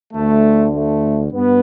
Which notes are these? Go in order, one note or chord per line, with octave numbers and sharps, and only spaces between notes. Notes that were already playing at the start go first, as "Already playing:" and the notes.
D2 D3 A3
A3
G2 B3